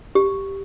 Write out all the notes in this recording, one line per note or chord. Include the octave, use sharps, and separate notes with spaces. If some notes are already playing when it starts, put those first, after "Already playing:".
G4